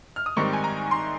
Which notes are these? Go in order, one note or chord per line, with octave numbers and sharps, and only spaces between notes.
F6
D#6
G#2 D#3 G3 C4 D#4 C#6
G#5
A#5
C6